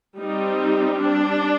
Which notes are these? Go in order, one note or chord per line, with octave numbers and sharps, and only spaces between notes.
G3 C4 D#4
D4